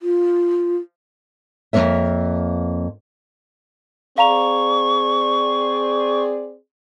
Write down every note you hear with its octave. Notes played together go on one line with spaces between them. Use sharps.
F4
F2 D#3 A#3 C#5 E5
C4 G#4 D5 F5 A#5 C#6 F7